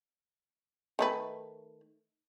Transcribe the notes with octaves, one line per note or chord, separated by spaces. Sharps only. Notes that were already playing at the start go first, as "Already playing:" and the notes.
D#3 A3 B4